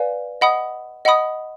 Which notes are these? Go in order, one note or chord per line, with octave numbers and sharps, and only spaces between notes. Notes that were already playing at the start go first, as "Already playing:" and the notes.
Already playing: B4 D5 F5 G#5
D#5 F#5 B5 D#6
D#5 F#5 B5 D#6